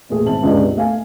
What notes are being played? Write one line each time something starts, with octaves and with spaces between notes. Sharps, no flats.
E2 A#2 A3 G#4
G#1 C4 E4 A5 F#7
G1 C#2 G2 G#3 D5 D#5
C3
A3 F5 G#5